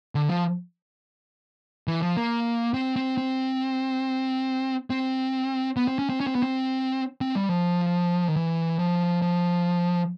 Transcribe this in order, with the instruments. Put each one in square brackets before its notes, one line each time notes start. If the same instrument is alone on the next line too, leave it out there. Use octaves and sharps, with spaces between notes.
[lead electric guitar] D3
F3
E3
F3
A#3
C4
C4
C4
C4
B3
C4
C#4
C4
C#4
C4
B3
C4
C4
G3
F3
D#3
E3
F3
F3